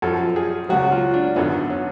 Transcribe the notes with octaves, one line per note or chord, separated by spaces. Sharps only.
F#2 F3 A4
G#4
C#2 C#3 F#3 F#4
F4
D4
G#1 F#2 D3 B3
C#4